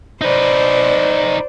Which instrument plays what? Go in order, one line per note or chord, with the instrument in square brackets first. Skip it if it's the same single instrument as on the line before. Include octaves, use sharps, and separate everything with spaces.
[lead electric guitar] D#4 B4 [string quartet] C5 D5